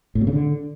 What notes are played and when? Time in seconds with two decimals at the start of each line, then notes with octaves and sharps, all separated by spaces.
0.15 A2
0.21 B2
0.27 C#3
0.33 D3